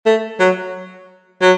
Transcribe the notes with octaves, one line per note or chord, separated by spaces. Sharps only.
A3
F#3
F#3